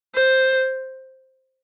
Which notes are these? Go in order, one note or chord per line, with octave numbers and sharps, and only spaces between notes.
C5